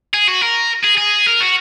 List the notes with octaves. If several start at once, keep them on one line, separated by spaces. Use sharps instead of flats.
G#4
F#4
A#4
G#4
G#4
A#4
F#4